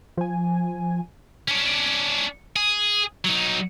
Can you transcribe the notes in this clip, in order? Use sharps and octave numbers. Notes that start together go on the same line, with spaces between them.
F3 G#5
C#4 D4
G#4
F#3 D#4